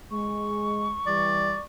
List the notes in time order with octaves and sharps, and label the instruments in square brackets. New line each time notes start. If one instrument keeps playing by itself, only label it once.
[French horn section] G#3 [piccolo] C#6
[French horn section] E3 G3 [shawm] D5